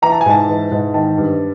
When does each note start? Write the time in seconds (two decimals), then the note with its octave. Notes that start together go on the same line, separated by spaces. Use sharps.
0.02 E3 A#5
0.12 A5
0.21 G#5
0.26 G#2 A5
0.49 E3
0.72 G#2
0.94 D#3 A5
1.18 G2